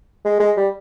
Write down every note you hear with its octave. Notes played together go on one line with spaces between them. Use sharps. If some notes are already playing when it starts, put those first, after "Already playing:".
G#3
G#3
G3